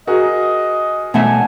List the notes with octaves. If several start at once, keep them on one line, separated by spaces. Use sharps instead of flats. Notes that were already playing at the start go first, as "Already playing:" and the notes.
F#4 G#4 A#4 D#5
B2 A3 E5 F#5 G#5 A5